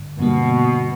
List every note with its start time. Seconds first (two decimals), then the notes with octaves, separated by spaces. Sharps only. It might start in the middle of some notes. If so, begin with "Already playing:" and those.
Already playing: G2 D3
0.19 G2 B2 D3 G3 A#3